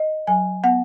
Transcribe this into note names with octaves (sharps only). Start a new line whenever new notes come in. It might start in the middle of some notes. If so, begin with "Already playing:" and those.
Already playing: D#5
F#3 G#5
B3 F#5